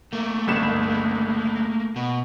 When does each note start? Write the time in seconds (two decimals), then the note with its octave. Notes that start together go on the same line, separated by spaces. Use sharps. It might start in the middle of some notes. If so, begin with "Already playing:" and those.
0.13 A3 A#3
0.47 G1 C#2 E7
1.96 B2